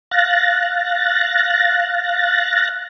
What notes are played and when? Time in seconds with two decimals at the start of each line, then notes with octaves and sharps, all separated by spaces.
0.11 F5 F#6 A6 A#6